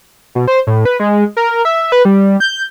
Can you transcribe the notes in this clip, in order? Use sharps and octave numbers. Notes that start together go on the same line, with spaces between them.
B2
C5
A2
B4
G#3
A#4
E5
B4
G3
G6